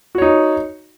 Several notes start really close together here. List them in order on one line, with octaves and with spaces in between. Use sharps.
F#4 C#5 D#4